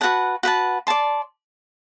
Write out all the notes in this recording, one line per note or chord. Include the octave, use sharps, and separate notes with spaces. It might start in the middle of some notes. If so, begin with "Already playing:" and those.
F#4 B4 F#5 A5
F#4 B4 F#5 A5
D5 A5 C6